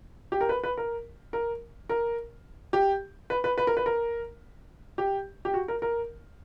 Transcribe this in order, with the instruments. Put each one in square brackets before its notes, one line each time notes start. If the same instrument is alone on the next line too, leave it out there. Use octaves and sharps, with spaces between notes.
[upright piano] G4
A#4
B4
B4
A#4
A#4
A#4
G4
B4
B4
B4
A#4
B4
A#4
G4
G4
F#4
A#4
A#4